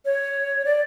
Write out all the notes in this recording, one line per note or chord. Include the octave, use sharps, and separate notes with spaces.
C#5
D5